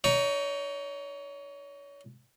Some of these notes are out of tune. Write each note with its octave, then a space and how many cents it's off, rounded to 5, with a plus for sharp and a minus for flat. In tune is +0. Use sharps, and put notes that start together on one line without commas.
D#4 +0 C#5 +30